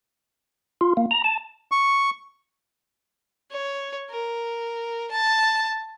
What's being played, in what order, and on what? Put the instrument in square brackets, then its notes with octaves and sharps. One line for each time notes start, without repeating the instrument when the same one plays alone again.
[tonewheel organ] F4
A#3
A#5
A5
[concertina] C#6
[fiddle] C#5
A#4
A5